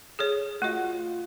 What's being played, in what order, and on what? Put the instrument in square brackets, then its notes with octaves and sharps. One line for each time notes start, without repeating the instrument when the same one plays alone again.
[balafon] G#4 A4 C#5
[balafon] A3 F#4 D#5 [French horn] F4